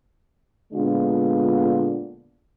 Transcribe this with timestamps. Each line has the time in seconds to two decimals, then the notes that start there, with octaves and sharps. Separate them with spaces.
0.73 A#2 D3 G#3 B3 D4 F4